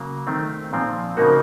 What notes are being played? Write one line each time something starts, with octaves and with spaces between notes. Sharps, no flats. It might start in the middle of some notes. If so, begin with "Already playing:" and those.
Already playing: C#3 F#3 A#3
D#3 A3 C4
A#2 F3 C4
C#3 F3 A#3 D#4 F#4 A#4